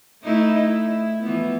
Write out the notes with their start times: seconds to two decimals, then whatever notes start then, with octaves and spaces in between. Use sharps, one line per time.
0.23 A3 D#4 E4
0.64 E4
1.23 E3 F3 B3